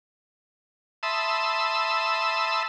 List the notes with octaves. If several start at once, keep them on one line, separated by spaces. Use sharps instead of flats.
E5 A5 B5 C6 D#6 E6